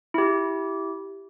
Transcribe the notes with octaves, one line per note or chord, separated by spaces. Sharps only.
E4 G4